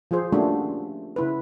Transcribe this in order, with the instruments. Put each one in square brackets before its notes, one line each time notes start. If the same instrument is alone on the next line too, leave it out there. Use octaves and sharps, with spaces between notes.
[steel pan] F3 F4 G#4 C5
A3 A#3 C#4 D4 F#4 G4
C#3 E4 B4